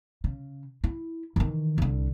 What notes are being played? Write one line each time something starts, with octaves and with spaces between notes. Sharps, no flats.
C#3
E4
D#3 E3
C2 D3